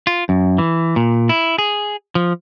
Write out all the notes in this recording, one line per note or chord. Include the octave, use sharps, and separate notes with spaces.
F4
F#2
E3
A#2
E4
G#4
F3